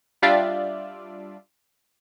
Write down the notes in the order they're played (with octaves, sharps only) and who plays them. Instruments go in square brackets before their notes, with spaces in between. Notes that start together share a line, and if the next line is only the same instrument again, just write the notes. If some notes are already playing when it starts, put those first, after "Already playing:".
[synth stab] G3 D4 F4 D5 E5